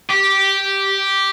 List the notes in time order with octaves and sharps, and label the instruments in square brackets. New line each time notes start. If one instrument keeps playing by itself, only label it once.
[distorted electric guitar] G4